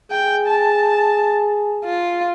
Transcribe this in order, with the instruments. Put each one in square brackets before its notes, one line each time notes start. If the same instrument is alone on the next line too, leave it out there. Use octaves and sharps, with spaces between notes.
[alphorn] G#4 [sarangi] G5
[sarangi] A5
F4